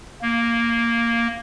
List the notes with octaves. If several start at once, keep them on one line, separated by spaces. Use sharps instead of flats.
A#3